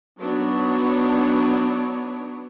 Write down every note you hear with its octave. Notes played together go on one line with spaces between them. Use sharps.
F#3 B3 D4 D#4 C#5